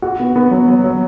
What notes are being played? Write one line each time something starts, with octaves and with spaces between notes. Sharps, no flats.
F#4
B3
B3
F#3
F#3
F#3